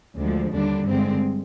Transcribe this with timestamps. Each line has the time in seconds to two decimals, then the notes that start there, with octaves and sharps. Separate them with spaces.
0.18 D2 D3 F3 G#3
0.52 D#2 D3 G3 D4
0.86 G2 D3 G#3 C4